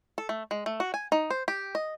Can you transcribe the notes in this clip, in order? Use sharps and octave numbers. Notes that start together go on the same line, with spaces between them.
A4
A3
G#3
A3
F#4
G#5
D#4
C5
G4
D#5